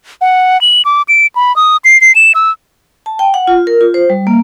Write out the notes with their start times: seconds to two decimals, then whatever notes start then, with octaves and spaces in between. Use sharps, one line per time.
0.21 F#5
0.61 F#7
0.85 D6
1.09 D7
1.36 B5
1.56 D#6
1.85 C7
2.01 C7
2.15 E7
2.35 E6
3.06 A5
3.19 G5
3.34 F#5
3.48 F4
3.67 A#4
3.81 F4
3.94 C5
4.10 G3
4.27 A#3